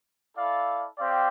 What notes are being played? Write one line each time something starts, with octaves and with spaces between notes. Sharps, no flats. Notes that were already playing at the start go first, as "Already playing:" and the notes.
E4 A4 D5 F5
C4 G4 D5 F5